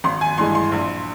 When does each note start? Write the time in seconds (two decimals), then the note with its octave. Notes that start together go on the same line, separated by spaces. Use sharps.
0.04 G#1 C6
0.21 G#5
0.38 G2 E3 G#3 C6
0.55 C6
0.72 A#1